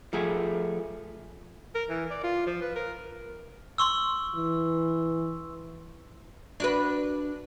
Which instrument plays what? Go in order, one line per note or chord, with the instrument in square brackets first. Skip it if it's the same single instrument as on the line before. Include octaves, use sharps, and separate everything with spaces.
[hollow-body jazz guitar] F3 A3 G#4
[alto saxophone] A#4
E3
D5
F4
F3
B4
A#4
[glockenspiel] C6 C#6 E6
[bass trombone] E3
[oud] D4 F#4 B4